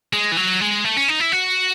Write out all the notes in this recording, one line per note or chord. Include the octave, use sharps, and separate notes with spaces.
G#3
E3
F#3
G#3
A3
C#4
D#4
E4
F#4